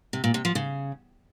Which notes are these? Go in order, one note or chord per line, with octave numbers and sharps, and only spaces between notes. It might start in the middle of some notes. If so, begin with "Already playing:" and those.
C3
A#2
C3
F3
C#3